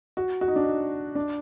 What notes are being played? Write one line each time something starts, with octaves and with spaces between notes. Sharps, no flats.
F#4
F#4
D#4
D4
D#4
D4